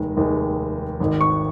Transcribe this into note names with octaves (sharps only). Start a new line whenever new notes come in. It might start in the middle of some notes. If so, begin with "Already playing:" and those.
Already playing: F1 D#2 D#3 G#3
F1 D#2 D#3 G#3
G#1 G#2 D#3
C#6